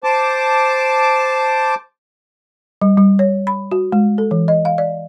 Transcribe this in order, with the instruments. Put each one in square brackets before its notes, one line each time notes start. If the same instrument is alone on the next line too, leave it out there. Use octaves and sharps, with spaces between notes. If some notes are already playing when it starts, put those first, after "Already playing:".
[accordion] C5 A5 D6
[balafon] G3
G3
C#5
B5
F#4
G#3
A4
E3
D#5
F5
D5